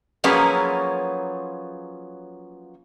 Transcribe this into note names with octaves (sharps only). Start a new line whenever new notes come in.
F3 F#3 A#3 C#4 G#4 B4